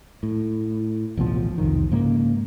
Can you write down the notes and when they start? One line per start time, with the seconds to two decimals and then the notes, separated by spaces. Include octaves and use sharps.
0.23 A2
1.17 A1 D2 B2 F3
1.58 C2 F2 D#3
1.92 G#2 C#3 A#3